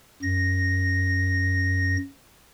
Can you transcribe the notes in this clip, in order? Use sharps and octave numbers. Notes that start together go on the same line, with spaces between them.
F#2 A#6